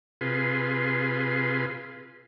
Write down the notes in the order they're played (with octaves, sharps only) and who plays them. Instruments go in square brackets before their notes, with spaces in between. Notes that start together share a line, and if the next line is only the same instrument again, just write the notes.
[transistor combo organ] C3 F4 G#4 B4 C6